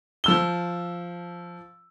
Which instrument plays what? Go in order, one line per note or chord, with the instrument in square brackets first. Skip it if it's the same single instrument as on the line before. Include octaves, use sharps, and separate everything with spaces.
[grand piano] F3 E6 G7